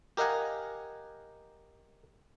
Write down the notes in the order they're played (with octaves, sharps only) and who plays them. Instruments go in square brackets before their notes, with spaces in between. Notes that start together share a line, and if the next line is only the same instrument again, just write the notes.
[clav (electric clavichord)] G4 A#4 D#5 F5 F#5 G#5